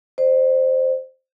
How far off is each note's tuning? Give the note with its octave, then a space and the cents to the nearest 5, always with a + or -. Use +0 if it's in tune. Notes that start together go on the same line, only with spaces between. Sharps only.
C5 +0 D#5 -45